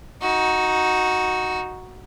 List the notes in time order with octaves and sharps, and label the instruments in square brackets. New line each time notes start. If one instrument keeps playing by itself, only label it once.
[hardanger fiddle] D#4 F#4